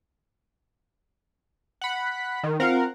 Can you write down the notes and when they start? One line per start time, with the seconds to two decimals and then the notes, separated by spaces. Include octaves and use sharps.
1.81 F#5 B5
2.43 D#3
2.60 C4 F4 A#4 F5 F#5